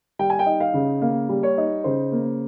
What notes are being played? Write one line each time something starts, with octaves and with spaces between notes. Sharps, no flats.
G3 G5
G#5
G5
D#4
F5
C#3
A#3 F5
G3
C#5
D#4
C#3 C5
A#3